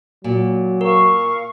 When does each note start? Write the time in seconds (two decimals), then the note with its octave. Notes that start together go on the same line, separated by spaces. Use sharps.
0.24 A#2 F#3
0.81 A#4 F5 C#6